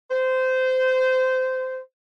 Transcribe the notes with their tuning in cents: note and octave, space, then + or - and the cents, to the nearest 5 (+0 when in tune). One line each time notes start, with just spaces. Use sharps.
C5 -20